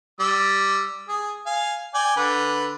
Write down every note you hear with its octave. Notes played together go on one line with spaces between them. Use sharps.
G3 E6
G#4
F5 G#5
D5 G5 G#5
D3 B4